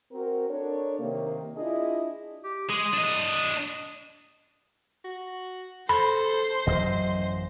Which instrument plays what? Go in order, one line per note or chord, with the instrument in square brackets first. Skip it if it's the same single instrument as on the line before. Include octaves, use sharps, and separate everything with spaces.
[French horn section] C4 F#4 A#4
D4 A4 A#4 C#5
C3 D#3 A#3
D4 E4 F4 G#4 D#5
[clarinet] G4
[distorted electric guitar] G#3 [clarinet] D#6
[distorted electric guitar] D4 D#5
[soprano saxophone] F#4
[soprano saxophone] A4 [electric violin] C5 [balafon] B5
[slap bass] A1 F#2 F#3 [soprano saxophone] D#5